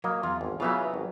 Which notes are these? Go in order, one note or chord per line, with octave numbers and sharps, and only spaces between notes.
F#3 A#3 D#5
E2 F4
G#1
C#3 E3 F#3 B3 F4 E5
G#1